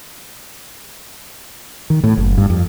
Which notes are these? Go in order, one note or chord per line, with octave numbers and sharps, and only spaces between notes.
D#3
A2
F#1
G2
F2